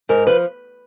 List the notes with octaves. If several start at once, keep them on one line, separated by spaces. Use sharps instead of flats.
G#2 A#4
F3 B4